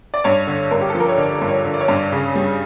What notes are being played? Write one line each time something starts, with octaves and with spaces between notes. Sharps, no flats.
D5
G2 C#5
D3
G2 A#4
G4
A4
F3
A#4
C#5
D3 D5
G2
C#5
D3
D5
C#5
G2
C#3
G3